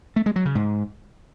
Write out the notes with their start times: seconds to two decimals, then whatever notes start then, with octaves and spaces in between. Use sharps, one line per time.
0.16 A3
0.26 G#3
0.36 F#3
0.45 C#3
0.55 G#2